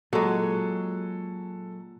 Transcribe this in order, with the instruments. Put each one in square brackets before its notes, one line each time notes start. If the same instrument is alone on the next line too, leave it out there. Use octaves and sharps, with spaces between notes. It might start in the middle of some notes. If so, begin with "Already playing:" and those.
[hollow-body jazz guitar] A#2 [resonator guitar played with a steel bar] F#3 G#3 [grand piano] A4